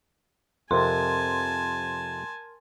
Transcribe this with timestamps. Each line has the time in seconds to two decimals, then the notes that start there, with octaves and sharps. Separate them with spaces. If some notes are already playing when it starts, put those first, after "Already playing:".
0.71 F2 C3 A#4 G#5 A5 C6